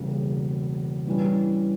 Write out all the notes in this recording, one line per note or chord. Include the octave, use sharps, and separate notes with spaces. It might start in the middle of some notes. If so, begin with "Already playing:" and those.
Already playing: E1 E2 C#3 G3 A#3
G2 E3 G3 C#4